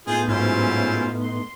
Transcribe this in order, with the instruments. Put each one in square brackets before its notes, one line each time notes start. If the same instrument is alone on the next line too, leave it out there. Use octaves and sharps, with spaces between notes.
[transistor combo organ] A2 B3 D#4 [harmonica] F4 G#4 [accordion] G6
[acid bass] G#2 [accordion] F#3 C#4 E4 [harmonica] F4 C5
[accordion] C6